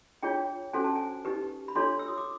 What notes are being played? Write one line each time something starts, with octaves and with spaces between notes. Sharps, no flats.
D4 F4 G#4 C#5 G5
C#4 F#4 A4 C5 G#5
A5
G#5
D#4 G4 B4
B5
D4 F4 A4 C#5 C6
E6
D#6
D6